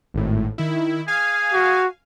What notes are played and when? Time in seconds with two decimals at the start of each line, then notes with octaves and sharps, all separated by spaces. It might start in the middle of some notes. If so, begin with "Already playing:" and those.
0.14 G#1 A2
0.58 D#3 E4
1.08 G#4 F5 G#5
1.53 F#4